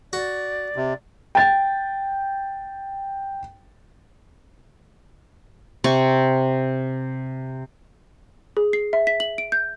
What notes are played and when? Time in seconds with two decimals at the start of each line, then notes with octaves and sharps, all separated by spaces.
0.13 F#4 D5
0.76 C3
1.35 G5 A6
5.84 C3 C#6
8.57 G#4
8.73 C7
8.93 E5
9.07 B6
9.20 F#7
9.38 D7
9.52 G6